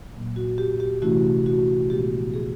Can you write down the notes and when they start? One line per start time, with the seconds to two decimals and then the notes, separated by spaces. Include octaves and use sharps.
0.14 A#2 F#3 A#3
0.36 F#4
0.58 G4
0.80 G4
1.02 C3 E3 A3 C#4 E4 F#4
1.46 F#4
1.89 A#2 F3 G#3 B3 D#4 G4
2.34 G#4